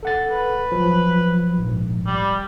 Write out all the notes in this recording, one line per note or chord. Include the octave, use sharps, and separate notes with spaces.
A4 F#5 A6
B4
F3 F#3
A#1 G#2
G3